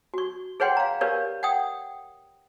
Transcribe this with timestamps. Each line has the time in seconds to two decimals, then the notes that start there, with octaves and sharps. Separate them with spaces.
0.14 F#4 C#6
0.60 G#4 B4 C#5 F#5 G5 C6
0.77 F5 A#5
1.01 G4 A#4 B4 C#5 D5 F5
1.43 F#5 G5 D#6